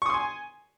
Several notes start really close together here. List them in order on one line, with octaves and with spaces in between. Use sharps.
C#6 D#6 C6 G#5